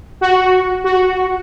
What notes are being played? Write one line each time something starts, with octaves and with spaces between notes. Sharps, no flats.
F#4
F#4